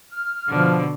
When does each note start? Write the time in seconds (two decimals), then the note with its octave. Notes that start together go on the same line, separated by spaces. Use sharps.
0.12 F6
0.49 B2 D3 F3